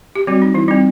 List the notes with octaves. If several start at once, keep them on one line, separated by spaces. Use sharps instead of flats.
G4
F#3 G3 C4 F#4
D#4
E3 E4
G3 C4 D#4